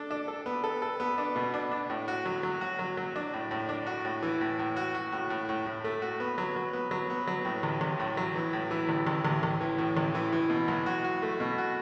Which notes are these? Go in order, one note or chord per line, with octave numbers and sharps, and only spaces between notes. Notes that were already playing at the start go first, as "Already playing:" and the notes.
Already playing: D4 A4
D4
A4
B3
A4
A4
B3
D4
B2
D4
D4
A2
F#4
F#3
F#3
F#4
F#3
F#3
D4
A2
A2
D4
F#4
A2
E3
A2
A2
F#4
F#4
A2
A2
A2
A2
A3
F#4
B3
F#3
F#3
B3
F#3
B3
F#3
A2
A1
A1
A2
F#3
E3
A2
E3
A1
A1
A1
A1
E3
A2
A1
E3
E3
B2
B1
F#4
F#4
A3
B2
F#4